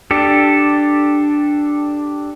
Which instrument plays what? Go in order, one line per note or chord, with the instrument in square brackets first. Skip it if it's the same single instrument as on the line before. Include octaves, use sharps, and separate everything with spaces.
[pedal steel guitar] D4 G4 A4